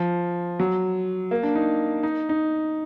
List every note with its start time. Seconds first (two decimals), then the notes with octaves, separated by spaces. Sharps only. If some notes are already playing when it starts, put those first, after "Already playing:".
Already playing: F3
0.60 F#3
1.31 A#3
1.43 D4
1.55 D#4
2.03 D#4
2.29 D#4